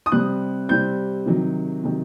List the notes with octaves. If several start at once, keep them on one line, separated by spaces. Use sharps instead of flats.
D#6
C3 G3 C4 F#6
C3 G3 C4 G6
C3 D#3 F#3
C3 D#3 F#3